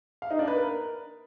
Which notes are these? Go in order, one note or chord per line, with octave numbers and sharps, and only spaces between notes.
F5
D#4
D4
B4
A#4